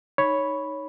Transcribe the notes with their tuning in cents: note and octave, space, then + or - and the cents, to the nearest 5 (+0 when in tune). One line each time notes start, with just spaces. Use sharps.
D#4 +0 C#5 +0 B5 +0